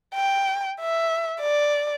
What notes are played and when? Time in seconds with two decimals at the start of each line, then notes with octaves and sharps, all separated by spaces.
0.14 G5
0.81 E5
1.41 D5